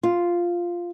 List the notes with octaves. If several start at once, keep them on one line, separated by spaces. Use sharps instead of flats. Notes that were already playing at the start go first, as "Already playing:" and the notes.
F4